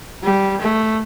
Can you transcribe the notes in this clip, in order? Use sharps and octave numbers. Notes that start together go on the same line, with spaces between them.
G3
A3